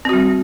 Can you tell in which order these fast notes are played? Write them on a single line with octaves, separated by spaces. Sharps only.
C4 F#4 G3